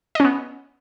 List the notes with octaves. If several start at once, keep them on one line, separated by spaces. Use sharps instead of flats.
B3 C#4 D#5